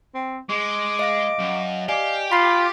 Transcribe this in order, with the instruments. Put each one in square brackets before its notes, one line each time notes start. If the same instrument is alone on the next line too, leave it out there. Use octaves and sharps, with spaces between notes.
[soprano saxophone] C4
[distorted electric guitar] G#3 [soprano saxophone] D6
[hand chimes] D#5 F5 A#6
[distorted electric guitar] F#2
[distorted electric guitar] G4 [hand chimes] D5 D#5 G#5 [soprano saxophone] F5
[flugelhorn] F4 [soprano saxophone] B5 [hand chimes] B6 C7